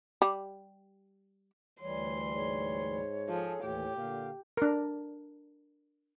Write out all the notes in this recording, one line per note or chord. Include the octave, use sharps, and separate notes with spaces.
G3
D2 E3 G3 C#5 C6
G#2 C#5
F3 G#4 A4
D#2 A2 E3 G4
A#2 D3 F5
D4 A#4